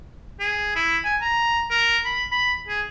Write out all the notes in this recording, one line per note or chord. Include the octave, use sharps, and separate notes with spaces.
G#4
E4
G#5
A#5
A#4
B5
B5
G#4